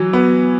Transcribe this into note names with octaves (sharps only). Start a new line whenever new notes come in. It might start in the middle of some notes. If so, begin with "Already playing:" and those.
Already playing: E3 F#3
B3